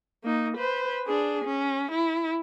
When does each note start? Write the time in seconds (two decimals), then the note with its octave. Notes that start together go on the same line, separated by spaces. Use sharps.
0.24 A#3 D#4
0.57 B4 C5
1.07 D4 G#4
1.45 C#4
1.92 E4